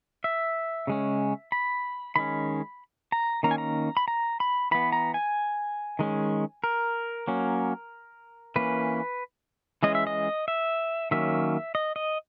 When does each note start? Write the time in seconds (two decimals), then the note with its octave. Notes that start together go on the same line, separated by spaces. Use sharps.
0.24 E5
0.87 C#3 G#3 C#4
1.52 B5
2.16 D#3 G#3 C#4 B5
3.12 A#5
3.43 D#3 A#3 C#4 A#5
3.51 G#5
3.58 A#5
3.97 B5
4.08 A#5
4.40 B5
4.71 E3 B3 B5
4.92 A#5
5.14 G#5
5.99 D#3 G#3 C#4
6.64 A#4
7.28 F#3 A#3 C#4
8.56 E3 A#3 C#4 B4
9.83 E3 G#3 C#4 D#5
9.95 E5
10.07 D#5
10.48 E5
11.11 D#3 F#3 A#3 C#4 E5
11.75 D#5
11.96 D#5